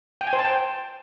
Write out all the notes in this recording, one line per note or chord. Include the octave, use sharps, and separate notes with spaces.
G5
G#5
C5
A5
G5